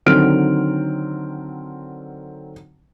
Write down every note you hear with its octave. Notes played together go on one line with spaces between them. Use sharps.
D3 D#3 F#3 C4 F6 D7